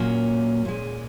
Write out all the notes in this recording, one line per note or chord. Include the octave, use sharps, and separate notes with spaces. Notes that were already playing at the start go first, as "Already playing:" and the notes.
Already playing: A#2 F#3 A#3 C#4
A#2 G#3